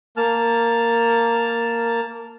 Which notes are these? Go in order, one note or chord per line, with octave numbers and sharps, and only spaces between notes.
A#3 A5 F6